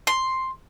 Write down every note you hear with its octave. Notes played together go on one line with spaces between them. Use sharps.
C6